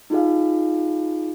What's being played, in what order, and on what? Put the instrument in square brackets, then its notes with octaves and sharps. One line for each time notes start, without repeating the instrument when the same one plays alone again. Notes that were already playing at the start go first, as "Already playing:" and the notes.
[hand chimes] D#4 F4 G#4 F5